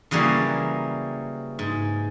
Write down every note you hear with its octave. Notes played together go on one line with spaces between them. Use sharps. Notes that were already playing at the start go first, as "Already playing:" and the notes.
C#3 E3 F#3 G3 A#3
G#2